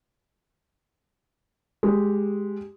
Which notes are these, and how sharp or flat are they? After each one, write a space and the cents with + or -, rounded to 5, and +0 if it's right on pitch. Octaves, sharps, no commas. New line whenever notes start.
G#3 +0 G4 +0